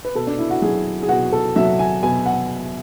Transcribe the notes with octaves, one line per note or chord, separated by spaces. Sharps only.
B4
B2 A4
D4
E4
F#4
F#3 G#4
G#4
B2 F#4
A4
F#3 E5
G#5
B2 G#5
F#5